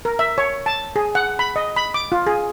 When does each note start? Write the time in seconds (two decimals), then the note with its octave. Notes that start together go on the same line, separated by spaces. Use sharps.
0.05 A#4
0.19 E5
0.38 C#5
0.66 A5
0.96 G#4
1.15 F#5
1.39 B5
1.56 D#5
1.76 B5
1.94 D6
2.12 F4
2.27 G#4